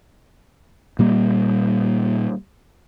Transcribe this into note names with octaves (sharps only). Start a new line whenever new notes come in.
A#2 G3 A#3